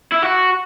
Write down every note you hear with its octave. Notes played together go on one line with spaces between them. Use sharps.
E4
F#4